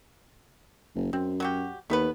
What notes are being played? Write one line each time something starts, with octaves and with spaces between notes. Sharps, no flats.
F#1
F#2 C4
F#3 F#4 G4
D#2 A3 B3 B4